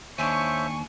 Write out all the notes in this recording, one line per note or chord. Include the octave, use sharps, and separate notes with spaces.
D#2 D4 C5 C#5 E5 G#5 C#6